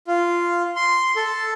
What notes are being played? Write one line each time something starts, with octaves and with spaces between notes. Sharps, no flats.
F4
C6
A4